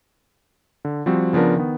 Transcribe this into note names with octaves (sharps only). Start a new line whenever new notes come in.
D3
F3 G3 C4 F#4
C#3 F3 B3 D4 A#4
D#3 B3